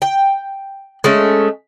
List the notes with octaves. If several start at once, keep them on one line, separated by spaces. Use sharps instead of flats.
G5
G#3 A3 C#4